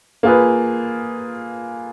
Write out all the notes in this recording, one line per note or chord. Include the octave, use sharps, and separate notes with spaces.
A#3 F4 G#4 B4